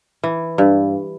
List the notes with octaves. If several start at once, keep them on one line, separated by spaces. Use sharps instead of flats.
E3
G2